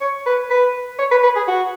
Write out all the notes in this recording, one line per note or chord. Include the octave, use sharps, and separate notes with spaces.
C#5
B4
B4
C#5
B4
B4
G#4
F#4